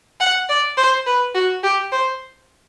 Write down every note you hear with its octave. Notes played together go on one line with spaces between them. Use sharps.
F#5
D5
C5
B4
F#4
G4
C5